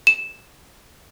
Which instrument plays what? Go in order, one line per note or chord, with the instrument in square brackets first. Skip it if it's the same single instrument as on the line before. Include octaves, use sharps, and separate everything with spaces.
[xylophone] E7